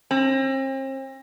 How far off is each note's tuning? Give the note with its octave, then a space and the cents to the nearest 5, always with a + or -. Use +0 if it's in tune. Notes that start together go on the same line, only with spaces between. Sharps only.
C4 +40